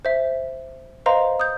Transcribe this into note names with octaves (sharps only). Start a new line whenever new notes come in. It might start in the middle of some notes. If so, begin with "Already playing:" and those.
C5 E5
B4 C5 D#5 F5 A#5 C6
D#6 G6